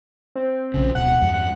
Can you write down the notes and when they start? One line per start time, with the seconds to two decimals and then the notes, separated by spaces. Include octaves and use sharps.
0.36 C4
0.74 A#1 C#3
0.95 D1 B2 F#5
1.21 E2 G2
1.34 F#5